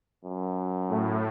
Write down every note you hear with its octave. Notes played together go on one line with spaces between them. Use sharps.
F#2
A2